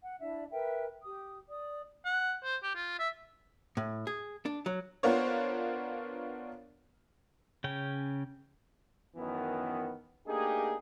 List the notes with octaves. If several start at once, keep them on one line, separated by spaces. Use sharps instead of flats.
F#5
D4 E4 D5 E5
A#4 B4 E5 G5
G4 D#6
D5 D#6
F#5
C5
G4
F4
E5
A2
G#4
D4
F#3
B3 D4 F4 A#4 C5 C#5
C#3 C#4 G5
F#2 D#3 E3 B3
A3 A#3 D4 D#4 G4 G#4